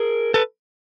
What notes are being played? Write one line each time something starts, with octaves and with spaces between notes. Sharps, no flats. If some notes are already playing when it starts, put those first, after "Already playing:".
Already playing: G#4 A#4
A4 B4